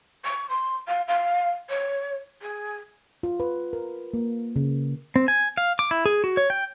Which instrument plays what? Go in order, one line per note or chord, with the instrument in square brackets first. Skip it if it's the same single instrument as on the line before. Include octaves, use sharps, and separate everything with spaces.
[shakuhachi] C#6
C6
F5
F5
C#5
G#4
[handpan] F4
B4
A#4
A#3
C#3
[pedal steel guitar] C4
G#5
F5
D6
E4
G#4
F#4
C#5
G5